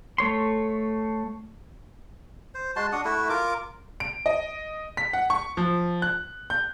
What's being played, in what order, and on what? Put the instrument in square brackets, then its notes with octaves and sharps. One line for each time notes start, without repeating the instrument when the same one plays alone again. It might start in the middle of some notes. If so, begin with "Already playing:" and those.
[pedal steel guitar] A3 C#5 C6
[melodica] C5
G#3 F#4 A5 C6
D4 F#4 F#5 D#6
A3 E4 F#4
F4 A#4 D6
[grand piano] D7
D#5
B6
F#5
C#6
F3
F#6
G6